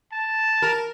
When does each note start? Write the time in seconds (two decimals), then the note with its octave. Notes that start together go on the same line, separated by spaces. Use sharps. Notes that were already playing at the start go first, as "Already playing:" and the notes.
0.12 A5
0.62 A#4